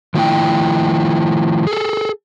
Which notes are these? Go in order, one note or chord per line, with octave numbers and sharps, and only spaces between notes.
D#3 F3 A3 E4 G5
G#4 A4